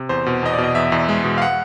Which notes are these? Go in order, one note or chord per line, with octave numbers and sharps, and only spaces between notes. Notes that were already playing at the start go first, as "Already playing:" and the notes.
Already playing: C3
E2 C5
B2
E2 D#5
D5
B2
D#5
E2 E5
E2
G#3
B2
F5
F#5